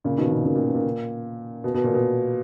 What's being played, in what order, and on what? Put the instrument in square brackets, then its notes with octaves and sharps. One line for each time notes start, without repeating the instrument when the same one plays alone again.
[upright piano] A#2 C#3
B2 D#3
A#2 C#3
A#2 C#3
A#2
B2
A#2
B2
B2
A#2
B2